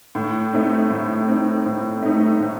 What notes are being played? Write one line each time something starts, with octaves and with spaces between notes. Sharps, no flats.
A2
A3 C4 D#4
A2
A3 C4 D#4
A2
A3 C4 D#4
A2